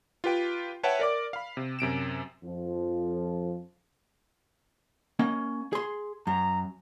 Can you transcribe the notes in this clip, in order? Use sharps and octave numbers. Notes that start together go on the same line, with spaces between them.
F4 G4 B4 G5
B4 C#5 E5 F#5 G5 A5
A#4 D5 D6
F5 B5
C3
F#2 C3 D7 E7
F2 F3
A#3 C#4 D#5
G#4 C6
F#2 A#5